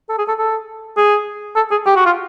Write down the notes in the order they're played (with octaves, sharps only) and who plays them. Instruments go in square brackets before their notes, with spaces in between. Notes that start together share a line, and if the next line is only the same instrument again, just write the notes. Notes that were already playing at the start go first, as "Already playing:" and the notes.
[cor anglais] A4
G#4
A4
A4
G#4
A4
G#4
G4
F#4
F4